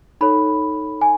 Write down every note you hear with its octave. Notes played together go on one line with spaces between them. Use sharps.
D#4 A4 C#5 B5
G#5